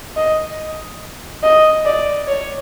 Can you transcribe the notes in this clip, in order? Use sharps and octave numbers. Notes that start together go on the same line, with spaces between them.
D#5
D#5
D5
C#5